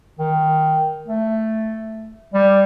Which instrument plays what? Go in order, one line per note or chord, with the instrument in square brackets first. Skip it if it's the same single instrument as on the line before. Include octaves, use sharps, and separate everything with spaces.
[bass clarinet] D#3
A3
G3